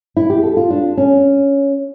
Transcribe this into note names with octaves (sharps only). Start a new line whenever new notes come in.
E4
G4
A4
F4
D4
C#4